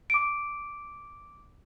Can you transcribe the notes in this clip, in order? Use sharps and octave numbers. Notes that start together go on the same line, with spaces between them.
D6 D7